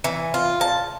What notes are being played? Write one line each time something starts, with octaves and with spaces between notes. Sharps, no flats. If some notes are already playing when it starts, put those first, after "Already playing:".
E3
F4
A5